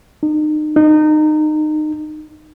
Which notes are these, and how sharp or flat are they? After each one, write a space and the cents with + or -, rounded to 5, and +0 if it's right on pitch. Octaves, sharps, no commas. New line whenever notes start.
D#4 -35
D#4 -25